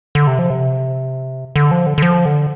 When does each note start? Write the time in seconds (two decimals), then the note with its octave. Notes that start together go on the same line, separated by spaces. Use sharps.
0.15 D3
0.27 C3
0.39 F3
0.50 C3
1.56 D3
1.71 F3
1.87 D3
1.98 D3
2.02 F3
2.26 D3